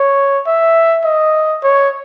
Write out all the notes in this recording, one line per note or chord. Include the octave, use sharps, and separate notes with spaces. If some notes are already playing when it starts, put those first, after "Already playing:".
Already playing: C#5
E5
D#5
C#5